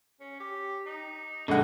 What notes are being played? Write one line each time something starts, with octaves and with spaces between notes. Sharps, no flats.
C#4
G4
D#4
A#1 D3 G#3 A#3 F#5